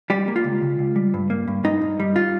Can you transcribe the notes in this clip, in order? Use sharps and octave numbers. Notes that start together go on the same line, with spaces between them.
G3 G4
A#3
F4
C#2
C#3
C#2
G3
G2
A#3
G2
G2 D#4
G2
G3
F4